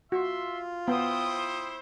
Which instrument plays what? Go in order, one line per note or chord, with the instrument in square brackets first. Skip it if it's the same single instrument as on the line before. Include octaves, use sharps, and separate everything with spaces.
[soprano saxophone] F4 [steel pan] F#4 [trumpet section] E5 C6
[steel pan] B3 [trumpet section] E4 C5 [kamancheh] G5 D#6